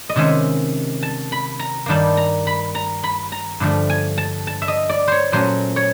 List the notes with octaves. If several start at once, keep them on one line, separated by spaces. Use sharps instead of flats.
D#5
C3 D#3 G#3 C#4 E5
A5
B5
A#5
G2 D#3 G3 A#3 D4 A5
A#5
B5
A#5
B5
A#5
G2 D3 F3 A3
G#5
A5
A5
E5
D#5
D5
C5 C#5
A#2 F#3 A3 C#4 C5
C#5